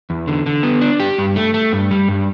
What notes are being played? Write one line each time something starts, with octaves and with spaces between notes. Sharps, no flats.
E2
D3
D3
B3
D4
G4
G2
A3
A3
G2
G3
G2